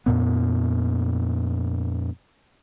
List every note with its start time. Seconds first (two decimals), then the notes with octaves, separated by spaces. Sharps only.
0.06 F2 A#2 B3